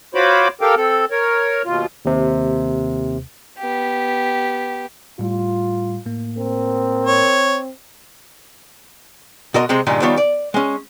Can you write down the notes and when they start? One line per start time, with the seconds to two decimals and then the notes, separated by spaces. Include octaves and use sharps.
0.15 F4 F#4 C5 C#5 B5 D6
0.61 G4 A4 A#4 F5 G5
0.77 C4 A4
1.11 A#4 C#5
1.65 D#2 B2 F4
2.05 D#2 C3
3.58 B3 G4
5.19 A2 G3 F4
6.06 A2 A#3
6.38 C4 A#4
7.06 C#5
9.54 B2 F#4 A#4 D#5 C6
9.69 C3 G#3 C4
9.87 G2 A#2 D3 D#3 G#3
10.02 D#3 F3 G3 B3 F4 C#5
10.17 D5
10.54 G#3 C#4